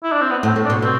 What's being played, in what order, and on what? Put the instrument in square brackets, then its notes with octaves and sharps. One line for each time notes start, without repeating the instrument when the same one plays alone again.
[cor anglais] E4
D4
C4
B3
[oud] A2
[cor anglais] C4
[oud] A2
[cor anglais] D4
[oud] B2
[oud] B2 [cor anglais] C4